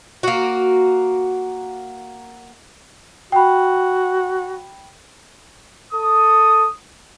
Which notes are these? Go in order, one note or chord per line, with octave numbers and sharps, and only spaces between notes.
A#3 F#4
F#4 G5 B5
A4 D#6